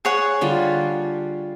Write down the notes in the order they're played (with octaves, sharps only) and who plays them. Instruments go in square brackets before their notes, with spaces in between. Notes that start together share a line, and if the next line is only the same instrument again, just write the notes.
[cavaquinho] G#4 C#5 F#5
[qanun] D3 G3 F4